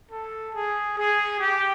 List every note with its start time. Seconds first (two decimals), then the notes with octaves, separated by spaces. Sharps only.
0.11 A4
0.55 G#4
0.98 G#4
1.39 G4